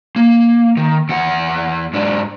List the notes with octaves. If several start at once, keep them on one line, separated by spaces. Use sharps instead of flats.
A#3
D#3
E2 F#5
G#2 D4